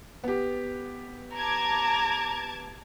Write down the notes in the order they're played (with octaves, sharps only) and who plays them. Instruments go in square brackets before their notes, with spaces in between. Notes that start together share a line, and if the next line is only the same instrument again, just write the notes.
[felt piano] B3 G4
[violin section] A5 D6 G#6 [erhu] A#5